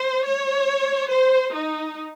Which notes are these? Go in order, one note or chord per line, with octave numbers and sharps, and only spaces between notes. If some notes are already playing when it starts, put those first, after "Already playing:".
Already playing: C5
C#5
C5
D#4